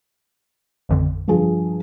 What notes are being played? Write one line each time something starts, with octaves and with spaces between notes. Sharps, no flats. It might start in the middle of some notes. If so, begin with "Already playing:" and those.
A1 F2 D3
G2 F3 G#4